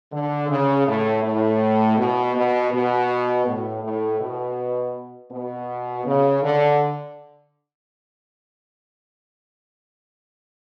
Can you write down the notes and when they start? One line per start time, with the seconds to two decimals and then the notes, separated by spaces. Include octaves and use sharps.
0.12 D3
0.49 C#3
0.86 A2
1.23 A2
1.97 B2
2.34 B2
2.71 B2
3.46 A2
3.83 A2
4.20 B2
5.31 B2
6.05 C#3
6.42 D3